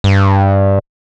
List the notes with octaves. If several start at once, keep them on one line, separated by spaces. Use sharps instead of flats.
G2